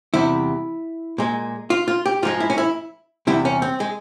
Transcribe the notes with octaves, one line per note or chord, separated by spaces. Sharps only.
E2 C3 G3 E4
A#2 G#3
F4
F4
G4
G#2 F3 G#3 F4
E4
C#4
E4
E2 C3 G3 E4
C#4
C4
G#3